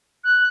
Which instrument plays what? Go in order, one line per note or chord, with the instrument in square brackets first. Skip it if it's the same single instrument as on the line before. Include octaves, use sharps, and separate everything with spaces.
[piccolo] F#6